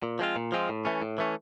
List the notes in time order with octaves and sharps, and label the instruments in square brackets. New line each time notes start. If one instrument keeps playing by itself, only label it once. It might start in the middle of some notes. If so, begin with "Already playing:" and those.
[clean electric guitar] A#2
F3 G#3 C4 F4
A#2
F3 G#3 C4 F4
A2
E3 A3 C#4
A2
E3 A3 C#4